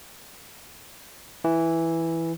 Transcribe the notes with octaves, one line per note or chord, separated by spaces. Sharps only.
E3